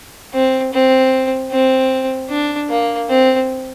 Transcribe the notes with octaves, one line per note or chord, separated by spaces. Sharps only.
C4
C4
C4
D4
A#3
C4